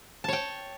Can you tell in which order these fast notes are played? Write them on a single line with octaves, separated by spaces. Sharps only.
A5 C#5 G5